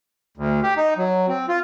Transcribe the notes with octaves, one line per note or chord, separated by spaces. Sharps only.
D2
G4
D#4
F#3
C4
F4